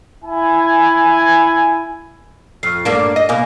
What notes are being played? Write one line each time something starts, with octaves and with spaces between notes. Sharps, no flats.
E4 G#5
F2 C#6 F6 C7
G2 A#3 D4
D#5
B2 A#3 F5 G#5 D#6